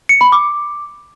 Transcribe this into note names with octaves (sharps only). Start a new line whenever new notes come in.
C#7
B5
D6